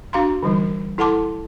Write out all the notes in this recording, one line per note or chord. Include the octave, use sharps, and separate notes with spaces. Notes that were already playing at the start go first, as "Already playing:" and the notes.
D4 F#4 F5 A#5 C6
D3 E3 G3 D#4
E4 A4 F#5 A5 C6 D6